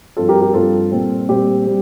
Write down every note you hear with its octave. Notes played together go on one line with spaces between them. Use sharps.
G2 F3 C4 F4 A4
G4 A#4
G4 A#4
G2 F3 C4 F4 A4
A#2 G3 C4
A#2 G3 C4 G4
G3 C4